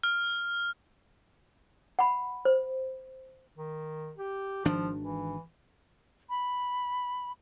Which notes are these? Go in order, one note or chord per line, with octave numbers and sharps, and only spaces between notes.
F6
F#5 B5
C5
D#3
G4
G#1 D#3 F3 D4
E3
B5